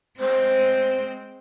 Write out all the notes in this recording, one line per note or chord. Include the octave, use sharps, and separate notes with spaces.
G#3 C4 C5